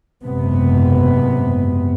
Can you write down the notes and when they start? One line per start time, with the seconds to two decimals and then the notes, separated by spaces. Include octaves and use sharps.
0.24 F#1 G#2 C3 B3